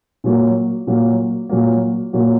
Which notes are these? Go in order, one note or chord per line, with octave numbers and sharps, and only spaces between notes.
A#2 F#3 A#3
A#2 F#3 A#3
A#2 F#3 A#3
A#2 F#3 A#3